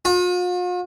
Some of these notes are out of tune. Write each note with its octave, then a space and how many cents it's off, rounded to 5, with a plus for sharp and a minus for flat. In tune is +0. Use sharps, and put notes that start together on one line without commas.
F4 +45